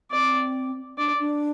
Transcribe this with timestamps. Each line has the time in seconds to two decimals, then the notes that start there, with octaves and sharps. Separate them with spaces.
0.11 C4 D5
0.98 D4 D5
1.19 D4